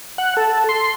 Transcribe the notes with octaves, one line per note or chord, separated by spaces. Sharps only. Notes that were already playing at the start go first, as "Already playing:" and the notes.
F#5
A4
C6